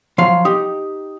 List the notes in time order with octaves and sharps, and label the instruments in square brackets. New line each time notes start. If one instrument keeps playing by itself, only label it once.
[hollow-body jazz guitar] F3 F#3 F5 [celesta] C6
[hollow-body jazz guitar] D#4 G4 [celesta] D#6